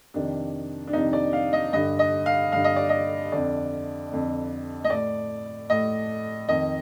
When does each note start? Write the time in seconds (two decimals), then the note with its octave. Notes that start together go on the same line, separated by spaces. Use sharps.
0.14 F2 C3 D#3 D4
0.87 D4
0.93 F2 C3 D#3 D#4
1.13 D5
1.33 F5
1.53 D#5
1.73 G2 D3 D#5
1.99 D#5
2.26 F5
2.52 G2 D3 F5
2.64 D#5
2.76 D5
2.89 D#5
3.32 F2 D3 D5
4.11 F2 D3
4.84 D#5
4.90 A2 D5
5.70 A2 D#5
6.49 F2 D#3 D#5